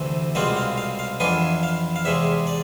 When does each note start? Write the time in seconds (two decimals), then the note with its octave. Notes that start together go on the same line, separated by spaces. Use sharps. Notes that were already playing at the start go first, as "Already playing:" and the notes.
Already playing: D2 C3 E3 A3 C4
0.35 C2 B2 G#3 C4 F4 D5
0.57 F5
0.77 F5
0.99 F5
1.20 F2 E3 B3 D4 F4 G#5
1.63 F5
1.96 F5
2.05 E2 C3 G#3 E5
2.47 D5